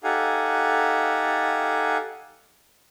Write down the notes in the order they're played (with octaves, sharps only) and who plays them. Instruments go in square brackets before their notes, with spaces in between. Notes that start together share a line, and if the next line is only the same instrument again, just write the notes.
[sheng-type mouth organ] D#4 G4 A4 F5 F#5 G#5